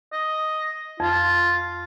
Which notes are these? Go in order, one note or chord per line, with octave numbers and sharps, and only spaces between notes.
D#5
F2 F4